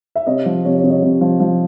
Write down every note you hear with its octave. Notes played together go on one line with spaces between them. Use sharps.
E5
C3 C#5 D#5
F3
C3 C#5
C#5
C3
C#5 D#5
C3
F3
F3